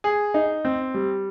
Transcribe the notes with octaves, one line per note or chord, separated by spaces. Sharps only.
G#4
D#4
C4
G3